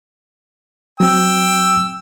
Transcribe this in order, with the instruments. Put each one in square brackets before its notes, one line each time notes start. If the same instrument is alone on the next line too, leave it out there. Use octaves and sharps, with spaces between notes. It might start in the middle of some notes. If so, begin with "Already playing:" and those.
[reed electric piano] F#3 C4 [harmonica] G5 E6